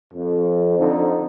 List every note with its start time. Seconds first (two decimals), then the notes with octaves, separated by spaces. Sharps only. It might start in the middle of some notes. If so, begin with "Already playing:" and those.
0.13 F2
0.78 F2 D3 D#4